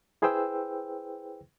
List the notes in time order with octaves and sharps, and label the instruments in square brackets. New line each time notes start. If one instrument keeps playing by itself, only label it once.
[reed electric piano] E4 G#4 B4 C5 G5 E6